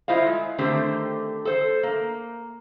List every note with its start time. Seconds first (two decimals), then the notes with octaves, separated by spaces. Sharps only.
0.08 E4 F4 C5 D#5 F5
0.26 G#3
0.58 D3 D#3 A3 C4 G4 C5
1.45 A4 C5
1.83 A#3